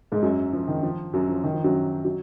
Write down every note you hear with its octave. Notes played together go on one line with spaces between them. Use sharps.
G#2 G#3
F#2 F#3
F3
D#3
F3
F#2 F#3
F3
D#3
F3
F#2 F#3
F#3